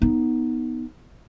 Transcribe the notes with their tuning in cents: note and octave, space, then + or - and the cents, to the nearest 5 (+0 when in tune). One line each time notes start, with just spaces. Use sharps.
B3 +0 D#4 +5